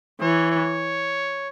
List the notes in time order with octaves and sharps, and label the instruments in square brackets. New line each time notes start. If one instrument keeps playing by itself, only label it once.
[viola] E3 [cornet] C#5
[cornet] C#5